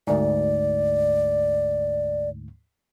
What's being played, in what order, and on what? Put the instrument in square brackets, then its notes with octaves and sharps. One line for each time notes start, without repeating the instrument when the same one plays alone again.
[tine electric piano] D2 G#2 [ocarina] D5